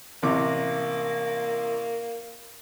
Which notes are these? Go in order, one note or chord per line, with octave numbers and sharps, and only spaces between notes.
A1 C3 A#3 D6